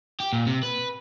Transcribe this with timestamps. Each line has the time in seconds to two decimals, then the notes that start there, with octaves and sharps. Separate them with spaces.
0.20 G4
0.33 A#2
0.47 C3
0.63 B4